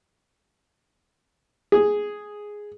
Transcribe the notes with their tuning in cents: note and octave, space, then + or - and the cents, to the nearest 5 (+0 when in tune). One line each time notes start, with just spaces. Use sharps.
G#4 +0